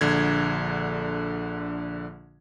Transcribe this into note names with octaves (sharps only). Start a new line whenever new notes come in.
A#1 D3 G#6